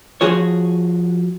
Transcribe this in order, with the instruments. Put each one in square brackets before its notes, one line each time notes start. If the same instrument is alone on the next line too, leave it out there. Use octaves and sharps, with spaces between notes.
[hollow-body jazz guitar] F3 F#4 G#4 C#5